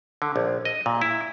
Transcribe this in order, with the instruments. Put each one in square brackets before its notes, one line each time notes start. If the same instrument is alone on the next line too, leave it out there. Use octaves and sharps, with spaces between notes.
[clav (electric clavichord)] D3
A#1
D#5
A#2
E4